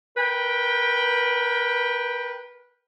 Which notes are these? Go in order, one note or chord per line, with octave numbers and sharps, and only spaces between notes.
A#4 B4 G5